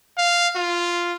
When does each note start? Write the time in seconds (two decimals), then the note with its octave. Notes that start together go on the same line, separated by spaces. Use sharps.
0.18 F5
0.56 F4